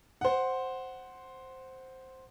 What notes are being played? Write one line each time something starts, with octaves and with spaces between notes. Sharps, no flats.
C5 F#5